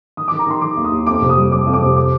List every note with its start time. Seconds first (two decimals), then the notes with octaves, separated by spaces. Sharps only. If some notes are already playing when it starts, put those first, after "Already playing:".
0.17 D#3 D#6
0.28 D#3 D6
0.39 A#5
0.47 D#3 C6
0.61 D#3 D6
0.77 D#2
0.85 D#6
0.91 D#2
1.07 F2 D6
1.21 C3
1.29 D#6
1.36 G3
1.51 G3 D6
1.66 F2
1.73 D6
1.81 C3
1.96 D6